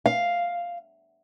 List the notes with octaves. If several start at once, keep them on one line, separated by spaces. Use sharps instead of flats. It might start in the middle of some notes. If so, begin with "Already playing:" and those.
F5